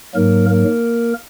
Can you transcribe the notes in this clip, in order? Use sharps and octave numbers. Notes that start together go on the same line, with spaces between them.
G#2 F#3 A#3 A#4
A#3 A#4